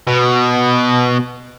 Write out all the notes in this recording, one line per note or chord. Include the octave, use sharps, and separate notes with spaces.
B2